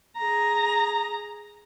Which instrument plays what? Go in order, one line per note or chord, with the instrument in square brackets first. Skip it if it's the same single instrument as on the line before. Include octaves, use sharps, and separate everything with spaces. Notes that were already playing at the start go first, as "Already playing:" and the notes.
[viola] G#4 A#5